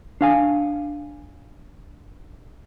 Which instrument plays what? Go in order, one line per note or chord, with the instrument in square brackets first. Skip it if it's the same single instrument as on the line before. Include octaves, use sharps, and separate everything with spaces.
[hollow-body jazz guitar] D4 F5 G#5